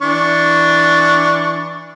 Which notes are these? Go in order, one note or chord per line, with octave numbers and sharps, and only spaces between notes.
E3 D4 C#6